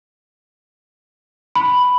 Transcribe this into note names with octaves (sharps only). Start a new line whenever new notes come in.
B5